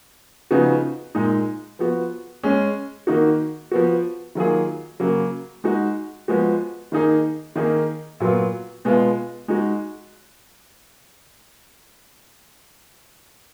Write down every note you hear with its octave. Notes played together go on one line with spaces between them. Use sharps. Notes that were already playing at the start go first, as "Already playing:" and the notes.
C#3 F3 B3 D#4 F#4
A#2 G#3 D#4
F3 B3 F#4
G#3 C#4 G#4
D#3 A#3 D#4 F#4
F3 B3 F#4
D#3 F#3 A#3 F4 G#4
C#3 F#3 A#3
G#3 D#4 F#4
F3 G#3 B3 F#4
D#3 A#3 D#4 G#4
D#3 A#3 D#4 G#4
A#2 F#3 B3 F4
B2 G#3 B3 F4
G#3 D#4 F#4